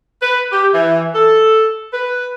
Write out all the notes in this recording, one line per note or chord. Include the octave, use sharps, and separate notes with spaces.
B4
G4
E3
A4
B4